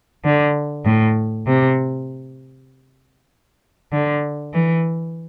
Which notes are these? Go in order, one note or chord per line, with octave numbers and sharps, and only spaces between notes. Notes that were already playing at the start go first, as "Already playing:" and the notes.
D3
A2
C3
D3
E3